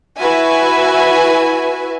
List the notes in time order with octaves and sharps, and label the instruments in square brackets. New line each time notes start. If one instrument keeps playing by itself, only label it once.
[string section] E4 F#4 B4 E5 G#5